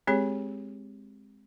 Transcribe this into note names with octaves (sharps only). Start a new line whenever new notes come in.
G#3 C4 G4 G#4 C#5